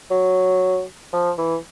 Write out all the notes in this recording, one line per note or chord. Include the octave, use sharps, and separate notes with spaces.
F#3
F3
E3